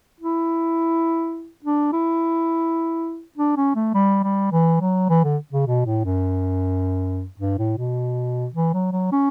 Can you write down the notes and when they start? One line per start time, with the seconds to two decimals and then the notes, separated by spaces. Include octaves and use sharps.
0.20 E4
1.64 D4
1.93 E4
3.38 D4
3.57 C#4
3.75 A3
3.95 G3
4.23 G3
4.52 E3
4.81 F#3
5.09 E3
5.24 D3
5.53 C#3
5.67 B2
5.86 A2
6.05 F#2
7.39 G2
7.58 A2
7.78 B2
8.54 E3
8.73 F#3
8.92 F#3
9.12 C#4